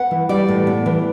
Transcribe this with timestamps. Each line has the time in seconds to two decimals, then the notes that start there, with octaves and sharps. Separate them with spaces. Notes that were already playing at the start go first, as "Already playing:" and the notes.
Already playing: B3 F#5
0.11 E3
0.29 G3 D5
0.48 A2
0.67 B3
0.86 E3